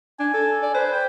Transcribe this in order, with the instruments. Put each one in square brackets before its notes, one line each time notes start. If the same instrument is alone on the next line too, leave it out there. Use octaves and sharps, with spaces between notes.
[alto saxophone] D4 [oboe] G#5
[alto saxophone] A4
D5
[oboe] B4 [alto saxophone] C5
[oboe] G5